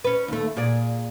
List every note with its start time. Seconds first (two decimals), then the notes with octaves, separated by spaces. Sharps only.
0.04 C#4 B4
0.28 D#2 A3
0.57 A#2 G#4 D5